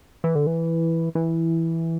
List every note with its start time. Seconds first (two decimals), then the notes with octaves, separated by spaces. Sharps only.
0.24 E3
0.35 D3
0.47 E3
1.15 E3